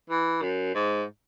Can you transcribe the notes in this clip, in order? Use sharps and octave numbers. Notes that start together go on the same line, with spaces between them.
E3
F#2
G#2